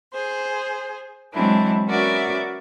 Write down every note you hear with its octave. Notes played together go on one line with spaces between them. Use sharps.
G#4 C5
E3 F#3 G#3 C4 D4 E4
B3 C#4 F#4 A#4 D5 E5